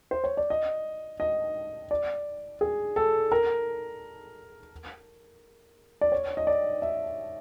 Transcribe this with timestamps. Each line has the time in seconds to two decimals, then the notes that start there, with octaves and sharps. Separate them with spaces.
0.11 C5
0.24 C#5
0.37 D5
0.50 D#5
1.20 D#5
1.91 D5
2.61 G#4
2.96 A4
3.32 A#4
6.01 D5
6.12 C#5
6.37 D#5
6.47 D5
6.82 E5